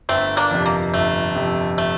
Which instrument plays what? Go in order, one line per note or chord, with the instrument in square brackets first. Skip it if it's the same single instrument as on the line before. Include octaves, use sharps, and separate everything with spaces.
[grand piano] G1 [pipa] A3 C4
[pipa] A#3 D4
[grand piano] F2 C3
[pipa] A#3
[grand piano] G1 [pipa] A3
[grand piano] F2 C3
[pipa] A3